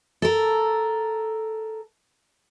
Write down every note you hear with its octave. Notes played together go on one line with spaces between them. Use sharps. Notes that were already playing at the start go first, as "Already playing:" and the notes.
A4 A#4